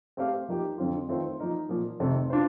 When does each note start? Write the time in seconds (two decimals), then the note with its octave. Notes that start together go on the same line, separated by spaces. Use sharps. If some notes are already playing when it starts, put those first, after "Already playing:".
0.17 A3 C4 G4 C5 F5
0.48 F3 A#3 D#4 G4
0.78 F2 D3 F3 C4 F4
1.08 D#3 A3 C4 F4 C5
1.40 F3 A#3 D#4 A#4
1.69 A#2 F3 A#3
2.00 F2 C3 D#3 A3 C4
2.30 D4 F4 C5